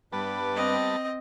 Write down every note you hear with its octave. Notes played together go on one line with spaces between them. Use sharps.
G2 G3 B3 B4 A5 D6
C4 D#5